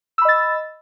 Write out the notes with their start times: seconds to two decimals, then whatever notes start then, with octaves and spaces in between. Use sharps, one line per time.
0.18 E6
0.22 B5
0.25 D#5
0.29 A6